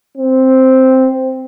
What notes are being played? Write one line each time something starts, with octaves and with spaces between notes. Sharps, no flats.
C4